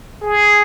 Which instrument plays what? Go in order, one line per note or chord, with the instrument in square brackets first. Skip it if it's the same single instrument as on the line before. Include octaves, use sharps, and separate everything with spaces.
[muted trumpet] G#4